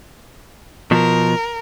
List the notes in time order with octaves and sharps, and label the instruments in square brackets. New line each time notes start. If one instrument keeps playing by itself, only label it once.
[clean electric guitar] B2 F3 [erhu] A#4